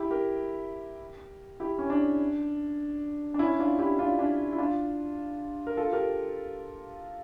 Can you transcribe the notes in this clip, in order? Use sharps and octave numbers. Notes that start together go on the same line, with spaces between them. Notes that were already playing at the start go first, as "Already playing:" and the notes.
Already playing: E4 G4
G4 A#4
E4 G4
C#4
D4
D4
C#4 E4
D4 F4
E4 G4
D4 F4
D4
E4
D4 F4
A#4
F4 A4
G4 A#4